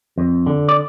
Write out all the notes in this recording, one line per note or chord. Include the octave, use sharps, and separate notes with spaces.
F2
D3
D5